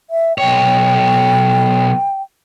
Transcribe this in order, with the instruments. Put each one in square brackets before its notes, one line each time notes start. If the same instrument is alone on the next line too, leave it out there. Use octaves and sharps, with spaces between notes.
[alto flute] E5
[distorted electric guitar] B1 C#5 [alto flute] G5